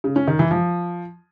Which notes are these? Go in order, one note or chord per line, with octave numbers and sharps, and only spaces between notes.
C#3
C#4
D#3
E3
F3